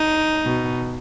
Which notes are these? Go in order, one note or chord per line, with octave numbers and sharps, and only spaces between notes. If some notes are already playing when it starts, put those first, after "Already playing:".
Already playing: D#4
B2